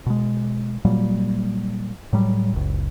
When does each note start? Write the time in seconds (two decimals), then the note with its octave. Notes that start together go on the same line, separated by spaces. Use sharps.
0.06 B2 G#3
0.85 A#2 F#3 G3 A#3
2.13 A2 F#3 G3
2.53 F#1 C#2